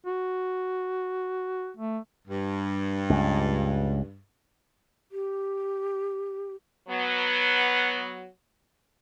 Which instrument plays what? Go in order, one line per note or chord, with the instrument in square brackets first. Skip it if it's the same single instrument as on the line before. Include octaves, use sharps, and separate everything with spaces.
[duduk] F#4
A3
[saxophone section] G2
[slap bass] C#2
[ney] G4
[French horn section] F#3 B3